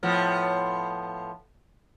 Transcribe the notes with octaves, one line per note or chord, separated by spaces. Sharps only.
A2 F3 B3